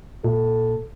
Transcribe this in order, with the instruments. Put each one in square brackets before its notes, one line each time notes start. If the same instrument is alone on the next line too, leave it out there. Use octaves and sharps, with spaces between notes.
[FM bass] A#2 [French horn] A4